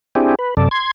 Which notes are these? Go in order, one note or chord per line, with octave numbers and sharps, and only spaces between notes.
C4 D4 E4 G4 G#4
B4
F#2 C3 A4 D5
C6 G#6